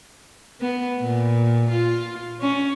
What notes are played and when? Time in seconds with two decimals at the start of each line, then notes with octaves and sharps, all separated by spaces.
0.60 B3
0.99 A#2
1.71 F4
2.41 C#4